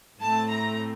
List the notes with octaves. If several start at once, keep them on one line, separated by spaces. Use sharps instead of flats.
A2 A3 C4 A5
A#5